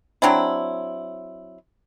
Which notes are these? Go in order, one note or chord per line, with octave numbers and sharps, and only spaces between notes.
F#3 C4 D4 E4